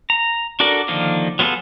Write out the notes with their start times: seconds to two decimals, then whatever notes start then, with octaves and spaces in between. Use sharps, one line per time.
0.10 A#5
0.60 D4 F#4 A4 A#4 D5
0.88 D3 D#3 F3 A#3 D4
1.39 F#3 B3 F4 G#4 A4